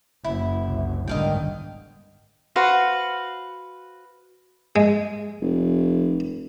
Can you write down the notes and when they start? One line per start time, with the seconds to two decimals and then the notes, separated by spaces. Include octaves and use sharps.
0.24 F#1 E4
0.64 C2
1.07 G1 G#2 D3 D#3 D#5 F5 G5
2.56 F#4 B4 C5 F5
4.76 G#3
5.42 F1